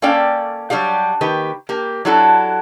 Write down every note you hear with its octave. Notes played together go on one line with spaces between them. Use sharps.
A#3 C#4 A4 D5 F5 G5
F#3 G3 D4 G4 F5
D#3 A#3 G4 B4
A#3 G4
F#3 D4 E4 F#4 A4